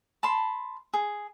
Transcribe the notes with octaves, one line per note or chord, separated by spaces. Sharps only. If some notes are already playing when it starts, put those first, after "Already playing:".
A5 B5 C6
G#4